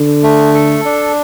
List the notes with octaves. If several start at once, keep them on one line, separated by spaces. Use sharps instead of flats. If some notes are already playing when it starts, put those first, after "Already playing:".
Already playing: D3
A3
A4
D4